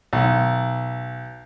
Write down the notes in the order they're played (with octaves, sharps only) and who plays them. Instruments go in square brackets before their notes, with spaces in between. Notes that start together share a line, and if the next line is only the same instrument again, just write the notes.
[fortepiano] B1